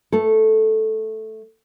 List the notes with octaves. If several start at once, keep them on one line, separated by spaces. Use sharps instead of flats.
A3 A4